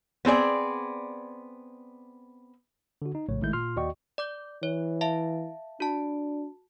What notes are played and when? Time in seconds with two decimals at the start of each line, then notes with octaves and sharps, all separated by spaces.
0.25 B3 C4 G#4 D5
3.02 D3 F#4
3.15 D#4
3.29 A#1 A2 C#3 A3 C#5
3.42 G#1 D#3 G#3 A3 E4 G6
3.53 A#2 F4 C6 F6
3.76 D#2 F#4 D5 D#5 G5 C#6
4.18 D5 D6 G6
4.63 E3 C#5
5.01 E5 F5 A5
5.80 D4 F#4 A5